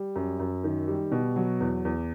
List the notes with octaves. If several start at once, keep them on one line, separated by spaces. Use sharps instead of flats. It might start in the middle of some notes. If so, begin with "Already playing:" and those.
Already playing: G3
F#2
F#2
D#3
G3
B2
F#3
E2
E2